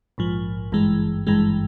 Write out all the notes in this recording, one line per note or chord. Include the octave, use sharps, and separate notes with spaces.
A#1 G#2 F3
G#1 G2 E3 G#3
G#1 G2 E3 G#3